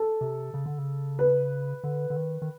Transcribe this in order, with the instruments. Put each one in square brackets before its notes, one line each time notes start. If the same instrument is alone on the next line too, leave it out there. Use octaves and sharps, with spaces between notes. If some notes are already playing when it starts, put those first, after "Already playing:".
Already playing: [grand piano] A4
[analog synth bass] C3
C#3
D3
C#3
[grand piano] B4
[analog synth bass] D3
D3
D#3
D#3